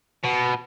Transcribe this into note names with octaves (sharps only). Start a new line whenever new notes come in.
B2